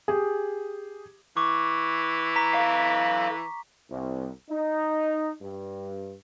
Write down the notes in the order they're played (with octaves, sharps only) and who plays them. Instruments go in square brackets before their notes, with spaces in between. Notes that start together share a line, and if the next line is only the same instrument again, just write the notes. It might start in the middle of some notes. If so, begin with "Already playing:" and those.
[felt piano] G4 G#4
[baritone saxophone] E3 [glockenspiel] C#6 D6
[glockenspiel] A#5 B6
[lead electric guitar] A4 F5
[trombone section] C2
D#4
G2